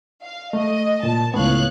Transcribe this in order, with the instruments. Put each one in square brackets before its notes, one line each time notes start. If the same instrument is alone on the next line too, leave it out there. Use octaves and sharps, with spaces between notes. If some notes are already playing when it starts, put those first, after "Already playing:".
[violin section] F5
[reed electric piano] A3 [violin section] D#5
[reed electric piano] A#2 [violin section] A5
[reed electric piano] C#2 A2 B3 [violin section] C#5 F5 F#6